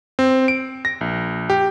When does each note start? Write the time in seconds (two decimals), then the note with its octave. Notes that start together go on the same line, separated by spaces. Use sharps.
0.19 C4
0.48 D7
0.85 A#6
1.01 A#1
1.50 G4